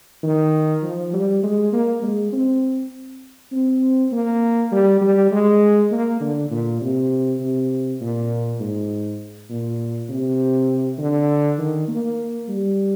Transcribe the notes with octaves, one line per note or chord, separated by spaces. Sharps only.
D#3
F3
G3
G#3
A#3
G#3
C4
C4
A#3
G3
G3
G#3
A#3
D3
A#2
C3
C3
A#2
G#2
A#2
C3
D3
D#3
A#3
G3